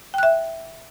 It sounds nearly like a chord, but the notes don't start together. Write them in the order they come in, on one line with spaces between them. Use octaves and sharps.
G5 F#6 E5